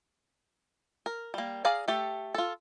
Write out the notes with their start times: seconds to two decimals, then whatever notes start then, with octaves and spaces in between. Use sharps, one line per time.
1.06 A#4
1.34 G3 A#3
1.65 G#4 D5 F5 A#5
1.88 A3 G4 A4
2.34 F4 A4